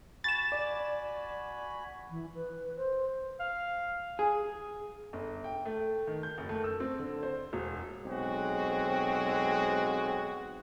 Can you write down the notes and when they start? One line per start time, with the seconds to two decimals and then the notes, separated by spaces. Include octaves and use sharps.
0.24 F#4 G#5 B5 A6 E7
0.52 D5
2.10 E3
2.35 B4
2.76 C5
3.40 F5
4.19 G#4
5.13 G1
5.44 G5
5.66 A3
6.07 D#3
6.23 G6
6.38 F#1
6.49 A3
6.64 E6
6.80 C4
6.99 D3
7.23 C5
7.53 E1
8.05 B1 G#3 C4 F#4